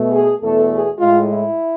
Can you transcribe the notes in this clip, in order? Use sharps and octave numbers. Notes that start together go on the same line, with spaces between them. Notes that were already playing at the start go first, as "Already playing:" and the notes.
Already playing: B2 A3
G#4
E2 B2 A3 A4
G#4
A2 G#3 F4
E4